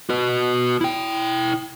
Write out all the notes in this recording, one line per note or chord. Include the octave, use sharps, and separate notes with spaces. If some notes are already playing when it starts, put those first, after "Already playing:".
F#4 B4
E4 G5